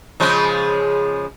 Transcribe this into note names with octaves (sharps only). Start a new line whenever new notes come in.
C#3 F3 G#3